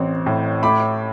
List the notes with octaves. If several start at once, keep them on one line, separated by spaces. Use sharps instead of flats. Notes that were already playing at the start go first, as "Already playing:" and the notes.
Already playing: A1 C4
A2
A3 B5 D6